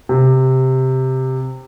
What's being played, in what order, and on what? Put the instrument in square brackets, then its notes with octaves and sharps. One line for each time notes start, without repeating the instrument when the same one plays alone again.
[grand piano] C3